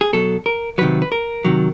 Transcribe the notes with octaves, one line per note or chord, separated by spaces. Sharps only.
G#4
B2 F#3 A4
A#4
C3 D#3 F#3 B4
B4
A#4
C3 D#3 F#3